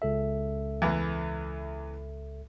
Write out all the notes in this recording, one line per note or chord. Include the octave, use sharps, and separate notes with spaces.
C#2 A4 E5
E2 E3